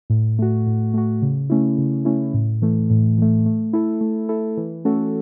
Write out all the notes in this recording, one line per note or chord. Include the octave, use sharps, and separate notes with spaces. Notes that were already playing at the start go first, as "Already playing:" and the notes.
A2
A3 F#4
A2
A3 F#4
C#3
A3 C#4 E4
C#3
A3 C#4 E4
A2
E3 A3
A2
E3 A3
A3
E4 A4
A3
E4 A4
E3
A3 C#4 F#4 A4